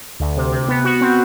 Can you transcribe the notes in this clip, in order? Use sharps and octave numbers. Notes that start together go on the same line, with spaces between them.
D2
C3
C3
B3
F#4
C4